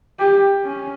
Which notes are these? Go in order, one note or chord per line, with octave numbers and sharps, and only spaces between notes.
G4
C#4